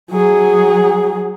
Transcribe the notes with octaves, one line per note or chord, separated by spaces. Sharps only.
F#3 G#4